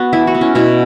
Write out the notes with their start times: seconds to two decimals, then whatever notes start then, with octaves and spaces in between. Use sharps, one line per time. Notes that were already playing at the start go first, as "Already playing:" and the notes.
Already playing: B3 F#4
0.13 E3 E4
0.27 F#4
0.35 B3
0.41 C#4
0.55 B2 E4